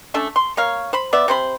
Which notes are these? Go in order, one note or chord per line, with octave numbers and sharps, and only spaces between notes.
A3 C#4 D4 A4
C6
A#3 C#5 F5
C5 B5
B3 D5 E5
C3 C5 B5